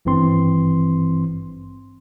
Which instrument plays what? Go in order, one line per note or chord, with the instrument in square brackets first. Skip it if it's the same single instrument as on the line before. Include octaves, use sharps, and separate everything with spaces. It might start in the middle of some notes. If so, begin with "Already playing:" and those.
[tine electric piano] G#1 G2 E3 C4 C6